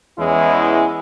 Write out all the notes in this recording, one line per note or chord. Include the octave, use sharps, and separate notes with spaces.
E2 E3 G#3 C#4 E4